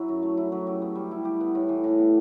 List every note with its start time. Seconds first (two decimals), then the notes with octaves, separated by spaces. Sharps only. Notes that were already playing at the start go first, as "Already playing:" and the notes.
Already playing: F#3 E4
0.09 F#2
0.23 A3
0.37 E4
0.52 F#3
0.67 G4
0.82 B3
0.95 G3
1.11 E4
1.25 G4
1.40 B3
1.55 A2
1.69 E3
1.84 A2
1.99 B3